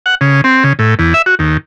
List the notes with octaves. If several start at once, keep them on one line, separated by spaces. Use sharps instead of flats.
F#5
C#3
C4
C#3
A2
E2
E5
F#4
D#2